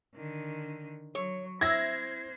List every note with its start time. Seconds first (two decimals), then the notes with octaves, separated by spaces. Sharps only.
0.15 D3 D#3
1.15 F#3 C#5
1.61 C4 E4 C5 G#6 A#6